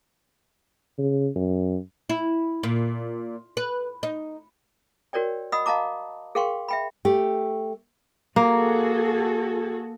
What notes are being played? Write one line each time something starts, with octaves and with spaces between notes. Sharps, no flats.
C#3
F#2
E4
A#2
B4
D#4
F#4 A#4 C#5 D5 G5
D#5 F#5 B5 D#6 E6
D#5 F5 A5 A#5 D6
G#4 A#4 F5 G5 C6 C#6
E5 G5 B5
A3 G4
A#3 F#4 G#4 A4